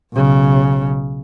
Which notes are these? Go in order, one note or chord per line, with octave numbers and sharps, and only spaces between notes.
B1 C#3